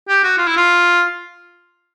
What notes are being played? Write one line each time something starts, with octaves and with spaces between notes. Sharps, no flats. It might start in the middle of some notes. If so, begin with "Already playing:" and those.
G4
F#4
F4
E4
F4